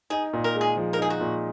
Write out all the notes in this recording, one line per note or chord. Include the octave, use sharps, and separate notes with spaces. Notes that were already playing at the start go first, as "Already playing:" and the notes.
D#4 G#4
A#2
A#4
G#3
G#4
F3
A#4
D#4 G#4
F#4
A#2